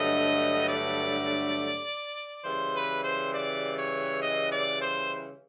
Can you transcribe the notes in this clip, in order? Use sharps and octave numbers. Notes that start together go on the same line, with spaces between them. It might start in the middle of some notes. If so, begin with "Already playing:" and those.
Already playing: G2 D3 F#3 A3 D#5
D5
C#3 E3 G3 C5
B4
C5
D5
C#5
D#5
D5
C5